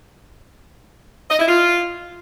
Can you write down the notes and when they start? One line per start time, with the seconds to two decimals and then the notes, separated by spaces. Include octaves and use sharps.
1.30 D#5
1.39 E4
1.48 F4